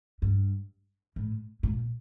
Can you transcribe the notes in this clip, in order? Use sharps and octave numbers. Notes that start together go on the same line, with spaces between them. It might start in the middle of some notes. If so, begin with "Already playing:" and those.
G2
A2
A#2